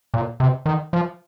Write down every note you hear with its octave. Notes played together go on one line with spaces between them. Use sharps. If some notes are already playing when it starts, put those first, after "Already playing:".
A#2
C3
D#3
F3